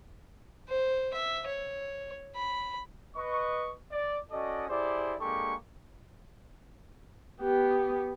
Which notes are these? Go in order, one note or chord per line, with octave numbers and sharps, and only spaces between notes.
C5
E5
C#5
B5
B4 D#5 C#6
D5
C#4 F#4 A4 D5 D#5
E4 G4 G#4 C5 D5
G#3 A#3 D4 G4 A4 C#6
B3 G4